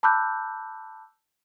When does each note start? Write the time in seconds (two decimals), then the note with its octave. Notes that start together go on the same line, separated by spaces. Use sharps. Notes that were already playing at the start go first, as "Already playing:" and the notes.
0.03 A5 B5 D6 E6 F#6 G6